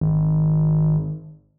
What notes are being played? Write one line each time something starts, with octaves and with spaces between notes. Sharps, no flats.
G#1